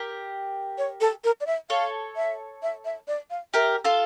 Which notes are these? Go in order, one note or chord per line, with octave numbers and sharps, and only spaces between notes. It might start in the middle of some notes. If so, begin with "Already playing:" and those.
Already playing: G4 A#4
C#5
A4
A#4
D5
E5
A4 C#5 F5
E5
E5
E5
D5
F5
G4 A#4 E5
F4 A4